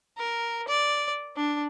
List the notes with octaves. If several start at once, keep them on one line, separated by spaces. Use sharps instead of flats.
A#4
D5
D4